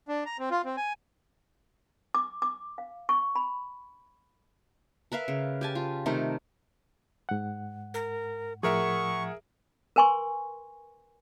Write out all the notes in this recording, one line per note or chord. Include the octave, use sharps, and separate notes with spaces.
D4
A#5
C4
F4
C4
G#5
D6
D6
F5
C#6
B5
A#4 B4 E5 F5
C#3
G4 G#5 A5
F4
C3 D#3 A3 A#4
G#2 F#5
A#4
A2 F3 G#4 A#4 E5 F#5 C#6
A#4 B4 G#5 C6 C#6